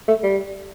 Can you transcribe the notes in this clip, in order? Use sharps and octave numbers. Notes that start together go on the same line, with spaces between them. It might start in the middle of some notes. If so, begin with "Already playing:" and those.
A3
G3